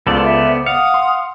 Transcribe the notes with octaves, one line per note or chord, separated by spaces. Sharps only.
C#2 B3 F4 A4 C5 D5
E5
F5 F#5 D#6 C#7
C6